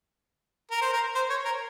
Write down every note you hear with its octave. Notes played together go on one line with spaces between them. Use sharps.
A#4
C5
A#4
C5
C#5
A#4